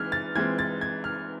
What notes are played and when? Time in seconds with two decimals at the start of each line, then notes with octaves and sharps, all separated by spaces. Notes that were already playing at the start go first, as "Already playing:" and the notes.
Already playing: E3 G#3 C4 F6 G#6
0.12 A6
0.35 E3 G#3 C4 G#6
0.59 A6
0.81 G#6
1.04 F6